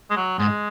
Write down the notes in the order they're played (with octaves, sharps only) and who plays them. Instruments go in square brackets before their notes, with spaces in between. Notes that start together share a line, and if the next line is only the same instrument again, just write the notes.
[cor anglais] G#3
F#3
[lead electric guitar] G#2 [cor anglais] G#3